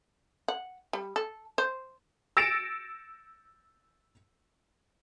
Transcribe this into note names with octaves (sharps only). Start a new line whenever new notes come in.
F#5
G3
A4
C5
E6 A6 A#6 C#7 D7 E7